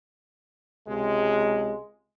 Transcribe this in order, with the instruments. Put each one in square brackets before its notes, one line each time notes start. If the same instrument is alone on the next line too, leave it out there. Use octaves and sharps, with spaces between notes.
[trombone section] C#2 C3 G#3